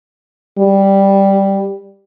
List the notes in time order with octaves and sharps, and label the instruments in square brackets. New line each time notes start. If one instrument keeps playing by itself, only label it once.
[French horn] G3